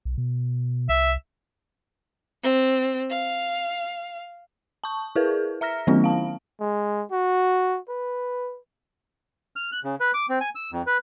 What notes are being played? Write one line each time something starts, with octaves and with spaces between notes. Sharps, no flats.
B1
B2
C2 E5
C4
F5
A5 C#6
E4 G#4 A#4 B4
E5 A#5 F6 A#6
D#3 F#3 A3 B3 C#4 E4
F5 A5
G#3
F#4
B4
F6
F#6
C#3
B4
D6
C4
G#5
E6
F2
B4